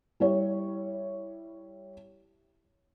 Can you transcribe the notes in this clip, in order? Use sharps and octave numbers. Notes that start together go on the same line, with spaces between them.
G3 E4 C#5